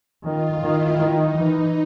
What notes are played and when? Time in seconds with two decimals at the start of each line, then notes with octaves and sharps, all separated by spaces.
0.23 D#3 F4
0.60 D#3 E4
0.98 D#3 D#4
1.36 E3